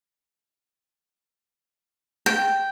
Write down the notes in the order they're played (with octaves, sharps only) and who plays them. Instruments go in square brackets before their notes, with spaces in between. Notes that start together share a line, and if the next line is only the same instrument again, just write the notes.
[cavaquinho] G5